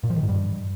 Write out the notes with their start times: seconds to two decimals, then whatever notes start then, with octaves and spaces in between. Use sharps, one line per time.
0.04 A#2
0.10 F3
0.16 D#3
0.22 G#2
0.29 G2